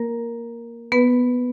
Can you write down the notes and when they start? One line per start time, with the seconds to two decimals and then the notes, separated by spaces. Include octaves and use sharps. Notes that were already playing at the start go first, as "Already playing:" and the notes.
Already playing: A#3 A#4
0.92 B3 B4